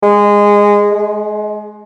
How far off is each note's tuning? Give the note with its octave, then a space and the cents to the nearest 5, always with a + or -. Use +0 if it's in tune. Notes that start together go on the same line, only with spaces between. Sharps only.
G#3 -15
G#3 +30